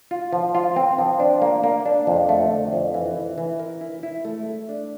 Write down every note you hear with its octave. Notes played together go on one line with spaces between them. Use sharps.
F4
F3
F4
C4
F3
D4
A#3
A#3
D4
F2
A3
D3
F2
E3
E3
E3
A#4
E4
E4
A3
A3
D4